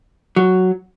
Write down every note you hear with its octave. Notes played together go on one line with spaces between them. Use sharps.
F#3